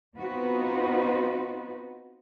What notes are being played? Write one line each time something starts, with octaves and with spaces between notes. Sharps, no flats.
B3 C4 D#4 F4 F#4 B4